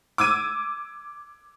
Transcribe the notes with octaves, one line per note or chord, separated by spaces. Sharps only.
D6 E6 G#6 D#7